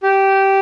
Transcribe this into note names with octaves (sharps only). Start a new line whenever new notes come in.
G4